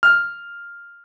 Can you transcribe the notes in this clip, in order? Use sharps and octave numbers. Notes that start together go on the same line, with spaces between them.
F6